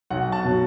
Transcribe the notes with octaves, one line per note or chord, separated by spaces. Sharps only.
B1 F#5
A5
B2 F#3